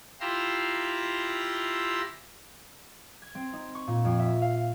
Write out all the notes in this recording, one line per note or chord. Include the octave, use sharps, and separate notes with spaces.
E4 F4 G4 A#5 C6 E6
G#6
C4
D#4
C#6
A#2
F2
E5
F5